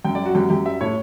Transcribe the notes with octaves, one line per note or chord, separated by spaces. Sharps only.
F#2 G5
F#3 D5
F#4
F#2 G4
F#2 G4
G3 E5
A2 C#5